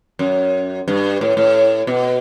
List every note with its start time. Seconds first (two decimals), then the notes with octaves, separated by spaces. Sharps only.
0.19 F#2
0.88 G2
1.21 A2
1.37 A2
1.87 B2